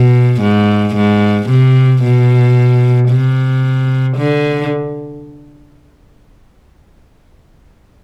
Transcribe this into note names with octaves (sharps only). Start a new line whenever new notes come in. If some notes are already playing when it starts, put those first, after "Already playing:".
Already playing: B2
G#2
G#2
C3
B2
C3
D3